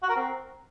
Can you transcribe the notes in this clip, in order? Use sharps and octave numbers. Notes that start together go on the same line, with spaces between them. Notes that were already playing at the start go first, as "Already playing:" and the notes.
F#4
A#4
C4